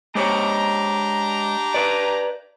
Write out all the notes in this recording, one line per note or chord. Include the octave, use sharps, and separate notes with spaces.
G#3 D4 G4 C5 C#5 A#5
B4 D5